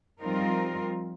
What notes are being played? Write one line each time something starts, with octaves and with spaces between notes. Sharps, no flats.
F3 G3 C4 D#4 F4 A#4